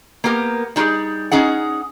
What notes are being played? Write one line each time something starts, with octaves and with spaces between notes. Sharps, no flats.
A#3 B3 G4 A#4
G3 D#4 F4 G4 G#4
C#4 D#4 G#4 F#5